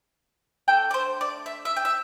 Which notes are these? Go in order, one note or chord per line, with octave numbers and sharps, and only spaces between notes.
A3 D4 A4 G5
D5
C5
D5
E5
E5
G5
E5